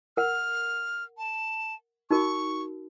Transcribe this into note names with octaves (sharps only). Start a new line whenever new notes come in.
A#4 F#5 F6
A5
D#4 F#4 A#4 C#6